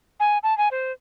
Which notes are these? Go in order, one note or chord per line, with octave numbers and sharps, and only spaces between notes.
G#5
A5
G#5
C5